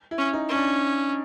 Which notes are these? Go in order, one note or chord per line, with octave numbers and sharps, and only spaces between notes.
E4
C#4
D#4
C#4
D4